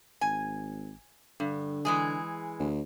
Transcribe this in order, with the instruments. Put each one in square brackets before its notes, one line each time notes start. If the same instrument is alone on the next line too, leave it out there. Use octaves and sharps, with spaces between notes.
[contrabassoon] G#1 [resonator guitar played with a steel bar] G#5
[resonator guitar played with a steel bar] G2 [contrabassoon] D3
[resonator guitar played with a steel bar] E3 G#3 G#4
[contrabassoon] D2